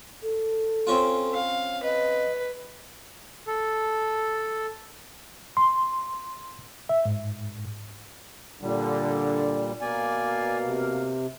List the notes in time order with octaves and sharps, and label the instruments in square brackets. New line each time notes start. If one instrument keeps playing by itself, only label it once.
[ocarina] A4
[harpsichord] C4 C#4 F4
[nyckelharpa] F5
[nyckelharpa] B4 [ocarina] D#5
[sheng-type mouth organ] A4
[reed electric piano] C6
E5
G#2
[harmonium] A#2 G3 [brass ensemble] D3
[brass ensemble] B2 A#3 F5 [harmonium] D5 G#5
[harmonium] C3